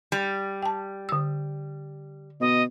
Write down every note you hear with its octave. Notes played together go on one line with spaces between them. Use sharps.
G3
G5 A5
D3 E6
B2 D#5